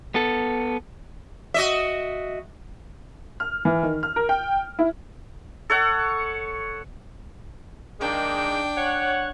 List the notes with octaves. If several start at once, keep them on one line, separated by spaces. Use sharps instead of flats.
B3 A4
F#4 D#5 E5
F6
E3
D#3
F6
A#4
G5
E4
A4 C#5 F#5
D#3 G#3 A#3 D4 G5
C#5 F#5